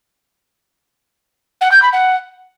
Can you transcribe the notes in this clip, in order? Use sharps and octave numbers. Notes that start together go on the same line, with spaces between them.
F#5
G6
B5
F#5